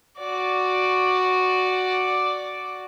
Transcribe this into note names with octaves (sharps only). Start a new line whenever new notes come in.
F#4 D5